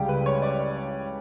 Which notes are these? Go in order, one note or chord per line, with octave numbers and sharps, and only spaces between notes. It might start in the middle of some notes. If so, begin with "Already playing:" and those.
Already playing: C#2 C#3 G3 G4
B4
C#5
D5